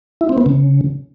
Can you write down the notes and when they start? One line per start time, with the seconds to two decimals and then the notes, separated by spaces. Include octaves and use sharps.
0.21 E4
0.29 C4
0.38 B3
0.46 C#3